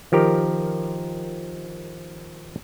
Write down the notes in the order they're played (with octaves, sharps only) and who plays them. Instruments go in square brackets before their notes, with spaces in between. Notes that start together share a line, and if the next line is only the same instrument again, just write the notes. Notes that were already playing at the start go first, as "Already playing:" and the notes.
[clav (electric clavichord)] D#3 F3 G4 A#4